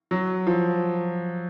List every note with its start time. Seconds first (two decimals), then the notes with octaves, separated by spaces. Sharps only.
0.11 F#3
0.47 F3